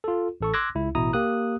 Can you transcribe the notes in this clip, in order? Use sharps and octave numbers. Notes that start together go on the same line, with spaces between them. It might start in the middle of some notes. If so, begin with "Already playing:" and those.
F4 A4
A1 A4 C#6
C6 D6 E6 F#6 G#6 A#6
C#2 E4
A1 B2 E4 A#5 D#6
A#3 G4 D#6 F#6